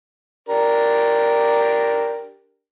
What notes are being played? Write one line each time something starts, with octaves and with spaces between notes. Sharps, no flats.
D4 G4 A#4